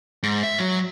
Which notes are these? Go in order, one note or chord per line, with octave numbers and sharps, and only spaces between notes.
G#2
E5
F#3